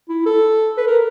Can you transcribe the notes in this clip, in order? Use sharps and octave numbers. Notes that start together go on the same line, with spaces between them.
E4
A4
B4
A#4